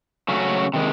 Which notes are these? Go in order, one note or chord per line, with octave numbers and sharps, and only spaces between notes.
C#3 F#3 A3 C#4 F#4
C3 D#3 G#3